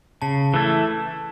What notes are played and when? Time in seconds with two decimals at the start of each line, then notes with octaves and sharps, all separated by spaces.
0.22 C#3 A5
0.54 E3 A3 E4 A4